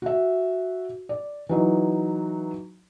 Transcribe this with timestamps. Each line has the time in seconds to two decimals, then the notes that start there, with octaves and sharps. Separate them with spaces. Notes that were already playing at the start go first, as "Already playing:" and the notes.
0.02 F#4 E5
1.09 D5
1.49 E3 F#3 D#4